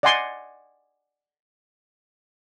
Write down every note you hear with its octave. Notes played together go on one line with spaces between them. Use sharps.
D5 D#5 F#5 G#5 C6